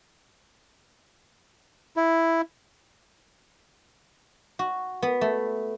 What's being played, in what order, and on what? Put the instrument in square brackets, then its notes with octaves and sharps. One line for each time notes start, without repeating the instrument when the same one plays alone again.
[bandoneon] E4
[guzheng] F#4
B3
A3